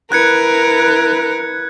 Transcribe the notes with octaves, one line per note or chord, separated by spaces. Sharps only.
E4 A#4 B4 F#6 G#6 C#7